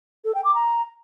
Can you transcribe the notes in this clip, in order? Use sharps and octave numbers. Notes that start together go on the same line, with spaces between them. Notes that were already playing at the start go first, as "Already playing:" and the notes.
A4
G5
D6
A#5